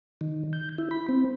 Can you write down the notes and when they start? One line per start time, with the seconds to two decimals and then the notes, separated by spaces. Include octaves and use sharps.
0.21 D#3
0.53 G6
0.78 E4
0.91 B5
1.09 C4